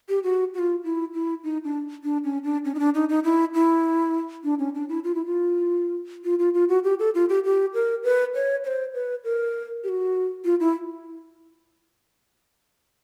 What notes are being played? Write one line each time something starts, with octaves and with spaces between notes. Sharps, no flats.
G4
F#4
F#4
F4
E4
E4
D#4
D4
D4
C#4
D4
C#4
D#4
D4
D#4
D#4
E4
E4
D4
C#4
D4
E4
F4
E4
F4
F4
F4
F4
F#4
G4
A4
F4
G4
G4
A#4
B4
C#5
C#5
C5
B4
A#4
G4
F#4
F4
E4